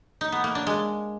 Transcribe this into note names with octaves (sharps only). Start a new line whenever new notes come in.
D#4
B3
A#3
D4
G#3